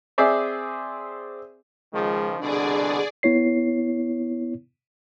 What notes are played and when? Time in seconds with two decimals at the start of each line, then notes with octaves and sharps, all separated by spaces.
0.18 C4 G#4 C5 D5 E5
1.93 C#2 D#3 F3 G#3
2.40 C2 B2 D3 D4 G#4 D5
3.23 B3 E4 C#5 C7